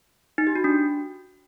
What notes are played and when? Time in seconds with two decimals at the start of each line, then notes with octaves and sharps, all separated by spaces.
0.38 D#4
0.47 G4
0.56 F#4
0.64 D4